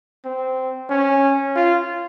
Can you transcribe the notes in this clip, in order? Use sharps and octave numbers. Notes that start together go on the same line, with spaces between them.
C4
C#4
F4